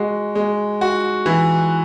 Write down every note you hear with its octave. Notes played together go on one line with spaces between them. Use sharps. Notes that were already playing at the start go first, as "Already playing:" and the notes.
Already playing: G#3 F#4
G#3
F#4
E3